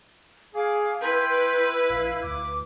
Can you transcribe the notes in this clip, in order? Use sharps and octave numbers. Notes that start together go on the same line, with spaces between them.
G#4 F5 G#5 D6
E4 B4 G5 C6 G6
A#1 F5
D2 D6